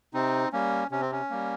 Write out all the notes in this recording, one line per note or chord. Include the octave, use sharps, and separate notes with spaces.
C3 C4 D#4
G3 A#3 C#4
C3 C#4
C4
C#4
G3 A#3